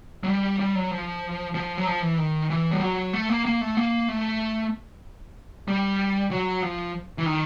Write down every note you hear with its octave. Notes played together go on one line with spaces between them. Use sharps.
F#3
G3
G3
F#3
F3
F3
F#3
F3
E3
D#3
E3
G3
F#3
A3
A#3
A#3
A3
A#3
A3
G3
F#3
F3
E3
D#3